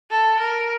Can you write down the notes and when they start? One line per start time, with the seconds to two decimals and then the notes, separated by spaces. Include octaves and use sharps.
0.10 A4
0.40 A#4